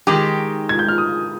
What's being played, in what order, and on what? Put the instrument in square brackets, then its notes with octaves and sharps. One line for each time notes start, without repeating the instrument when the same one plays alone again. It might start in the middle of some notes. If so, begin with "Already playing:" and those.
[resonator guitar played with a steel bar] D#3 G#3 D#4 G4 [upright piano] D6
[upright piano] G#6
G6
F6
D#6